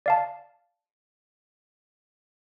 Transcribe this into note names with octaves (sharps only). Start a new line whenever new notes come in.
D5 F5 A5